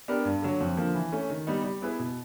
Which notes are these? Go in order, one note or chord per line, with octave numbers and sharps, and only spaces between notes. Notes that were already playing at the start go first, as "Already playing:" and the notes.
B3 D4 G4 A#4
G2
D3 F#3
F2
D3 F3 A#3
E3
A3 C#4
D#3
G3 B3 D#4
G3
B3 E4 G#4 B4
B2